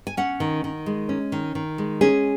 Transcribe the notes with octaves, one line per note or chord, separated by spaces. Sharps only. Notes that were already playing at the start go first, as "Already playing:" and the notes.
G#5
C#4 F#5
D#3
D#3
G#3
C#4
D#3
D#3
G#3
C#4 G#4